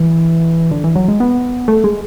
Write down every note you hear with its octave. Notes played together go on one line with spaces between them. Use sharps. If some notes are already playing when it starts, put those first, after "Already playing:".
Already playing: E3
D3
E3
F#3
G#3
B3
A3
G#3